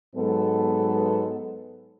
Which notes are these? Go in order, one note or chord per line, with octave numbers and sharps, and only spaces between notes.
G#2 F#3 B3 A4